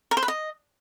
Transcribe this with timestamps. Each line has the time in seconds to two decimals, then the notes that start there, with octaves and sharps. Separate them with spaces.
0.11 A#4
0.17 C5
0.23 B4
0.28 D#5